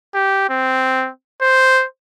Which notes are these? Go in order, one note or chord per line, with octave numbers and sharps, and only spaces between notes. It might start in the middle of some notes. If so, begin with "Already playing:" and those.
G4
C4
C5